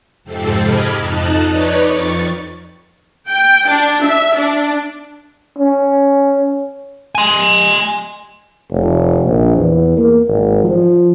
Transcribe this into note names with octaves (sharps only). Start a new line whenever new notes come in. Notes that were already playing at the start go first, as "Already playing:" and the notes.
F2 G#2 C3 C4 A4
D#5 B5 D6 F6 G#6
F2 D#4 A5 F#6
D#4 B4 C#5 D5
F2 C#6 A6
G5
D4
E5
D4
C#4
G#5 C6
F1
A#1
E2
A#3
G#1
F3